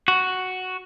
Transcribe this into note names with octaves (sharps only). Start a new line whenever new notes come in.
F#4